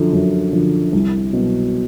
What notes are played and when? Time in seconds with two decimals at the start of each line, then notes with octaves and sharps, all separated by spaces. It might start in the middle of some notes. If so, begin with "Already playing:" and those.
Already playing: F#2 D3 F3
0.13 F#2
0.53 D3 F3
0.93 C2
1.33 B2 F#3